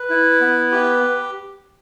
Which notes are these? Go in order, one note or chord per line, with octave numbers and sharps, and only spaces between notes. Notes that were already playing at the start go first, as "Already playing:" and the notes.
Already playing: B4
E4
B3
G4